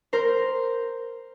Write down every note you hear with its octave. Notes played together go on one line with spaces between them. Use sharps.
A#4 C5